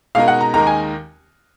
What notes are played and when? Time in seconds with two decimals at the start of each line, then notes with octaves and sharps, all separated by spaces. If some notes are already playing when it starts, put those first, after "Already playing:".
0.15 B2 G#3 D#4 A#4 F5
0.28 F#5
0.41 A#5
0.54 D#2 D#3 G#3 D#4 A#4 A#5
0.67 G#5